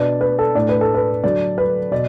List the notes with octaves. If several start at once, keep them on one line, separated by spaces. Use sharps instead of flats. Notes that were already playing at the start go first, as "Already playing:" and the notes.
Already playing: B2 B3 D4 D5
B4
A4
A2 A3 D4 D5
B4
A4
B4
D3 F#3 D4 D5
B4
B2 D5